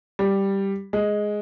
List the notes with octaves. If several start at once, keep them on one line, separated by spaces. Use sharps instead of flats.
G3
G#3